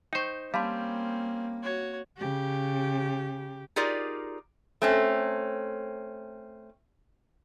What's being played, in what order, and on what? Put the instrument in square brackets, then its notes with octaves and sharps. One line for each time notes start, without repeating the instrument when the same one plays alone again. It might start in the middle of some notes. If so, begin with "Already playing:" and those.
[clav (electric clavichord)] D#4 C5 [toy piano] G5 C#6
[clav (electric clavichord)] G3 [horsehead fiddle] A#3 [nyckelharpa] C4 C#4 [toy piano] F5 A5 C6
[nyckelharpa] F#4 C#5
[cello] C#3 G4
[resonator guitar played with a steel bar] D#4 F4 G4 G#4 A#4 D5
A3 C4 C#4